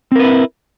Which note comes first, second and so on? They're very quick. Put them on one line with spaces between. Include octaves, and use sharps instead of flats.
C4 A#4 B4 E4